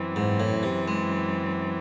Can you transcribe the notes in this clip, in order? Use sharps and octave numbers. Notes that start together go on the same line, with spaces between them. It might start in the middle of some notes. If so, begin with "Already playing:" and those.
Already playing: F#2 E3 C4
G#2
A2
C3
G#3